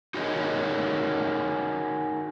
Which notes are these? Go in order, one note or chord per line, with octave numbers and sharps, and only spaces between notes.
D#4 F#4 G#4 A#4 C#5 D#5